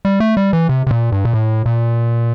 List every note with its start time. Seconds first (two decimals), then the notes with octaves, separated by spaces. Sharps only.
0.05 G3
0.20 A3
0.37 G3
0.53 E3
0.69 C3
0.87 C3
0.91 A#2
1.12 G2
1.25 A#2
1.33 A2
1.66 A#2